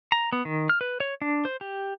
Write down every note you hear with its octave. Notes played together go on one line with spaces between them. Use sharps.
A#5
B3
D#3
F6
B4
C#5
D4
C5
G4